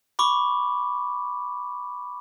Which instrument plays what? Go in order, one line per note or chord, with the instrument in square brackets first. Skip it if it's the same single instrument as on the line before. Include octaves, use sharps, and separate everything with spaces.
[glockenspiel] B5 C#6 D6